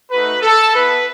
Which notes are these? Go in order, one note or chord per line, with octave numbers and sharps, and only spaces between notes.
A3 D#4 F#4 B4
A4
B3 E4 B4